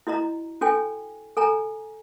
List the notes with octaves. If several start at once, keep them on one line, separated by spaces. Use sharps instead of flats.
E4 F#4 D#5 A#5
D4 F#4 A4 G5 G#5
A4 G#5 A#5